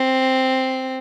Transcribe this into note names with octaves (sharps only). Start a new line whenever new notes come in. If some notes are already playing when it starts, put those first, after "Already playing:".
Already playing: C4